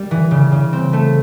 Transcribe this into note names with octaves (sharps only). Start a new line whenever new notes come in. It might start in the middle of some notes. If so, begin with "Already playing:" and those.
Already playing: G3
E3
C#3
C#3
C4
A3